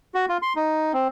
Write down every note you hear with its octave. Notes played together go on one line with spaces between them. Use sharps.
F#4
F4
C6
D#4
C4